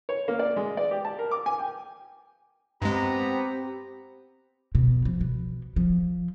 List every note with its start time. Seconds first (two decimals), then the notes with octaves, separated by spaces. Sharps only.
0.09 C#5
0.28 A#3
0.39 D5
0.56 G#3
0.77 D5
0.91 G4
1.05 A5
1.19 A#4
1.31 D6
1.46 G#5
1.58 G5
2.82 G2 G#3 B3 C4 G4 A#5
4.75 B2
5.05 F3
5.21 B2
5.76 F3